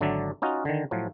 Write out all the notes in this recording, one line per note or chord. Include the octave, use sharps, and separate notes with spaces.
G#1 D3 F#3 D4 D5 E5
C#4 D#4 F4 F#4
D3 D#3
A2 F3 F#3